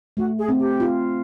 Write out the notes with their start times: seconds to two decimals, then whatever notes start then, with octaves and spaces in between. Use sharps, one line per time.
0.17 A3 F#4
0.38 G#4
0.49 C4
0.59 G4
0.80 F4